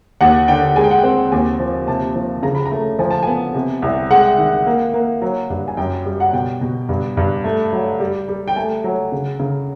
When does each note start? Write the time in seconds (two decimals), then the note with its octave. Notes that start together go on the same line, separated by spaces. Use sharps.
0.21 D#2 F#5
0.48 D3 G5
0.76 G#3 G#5
0.84 G5
0.91 F#5
0.99 C4 G5
1.32 D#2 G#5
1.60 F3
1.88 C3 A5
2.16 F3
2.43 C#3 A#5
2.55 B5
2.66 A#5
2.71 A3
2.99 F3 G#5
3.11 A5
3.23 B3 G#5
3.55 C3
3.82 C2
4.11 G#3 F#5
4.38 D#3
4.66 A#3
4.94 A#3
5.22 F#3
5.50 G2
5.68 G#5
5.77 F#2 G5
6.06 G3
6.20 F#5
6.33 B2 G5
6.61 B2
6.89 G2
7.17 G2
7.44 A3
7.73 F#3
8.00 G3
8.28 G3
8.48 G5
8.56 A3 G#5
8.84 F#3
9.12 C#3
9.40 C#3